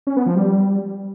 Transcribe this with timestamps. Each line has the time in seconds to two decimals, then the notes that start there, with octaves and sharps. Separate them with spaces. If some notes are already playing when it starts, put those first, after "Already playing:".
0.07 C#4
0.17 B3
0.26 F3
0.36 G3